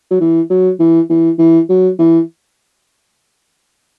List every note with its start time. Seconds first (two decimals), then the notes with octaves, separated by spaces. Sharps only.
0.11 F#3
0.21 E3
0.50 F#3
0.80 E3
1.10 E3
1.39 E3
1.69 F#3
1.99 E3